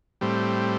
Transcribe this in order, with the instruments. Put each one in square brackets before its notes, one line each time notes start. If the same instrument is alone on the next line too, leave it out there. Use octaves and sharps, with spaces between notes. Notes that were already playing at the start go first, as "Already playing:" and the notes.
[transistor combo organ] A2 G3 C4